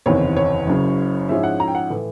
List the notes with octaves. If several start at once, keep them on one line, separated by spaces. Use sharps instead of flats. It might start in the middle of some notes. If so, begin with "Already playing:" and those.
F#1 E2 C3 D#3 C#5
C#5
F#1 F#2 C#3
G#2 F3 G#3 C#4 E4 E5
F#5
A#5
G5
F#5
A2 E3